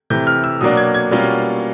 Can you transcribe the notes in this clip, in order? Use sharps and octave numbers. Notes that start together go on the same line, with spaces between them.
C3 E3 A3 G6
F6
E6
B2 F#3 A#3 D4 D#6
G#6
G#6
B2 G3 A#3 C#4 F4